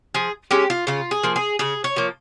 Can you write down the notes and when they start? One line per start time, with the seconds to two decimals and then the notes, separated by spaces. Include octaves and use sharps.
0.14 F3 G#4
0.51 G#3 C#4 G4
0.70 F4
0.87 C#3 F4
1.11 G#4
1.23 F3 A#3
1.36 G#4
1.59 C#3 G#4
1.84 C#5
1.96 F3 A#3